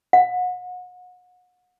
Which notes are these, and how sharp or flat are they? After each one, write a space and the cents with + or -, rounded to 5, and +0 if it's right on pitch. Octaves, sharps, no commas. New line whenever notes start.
F#5 -35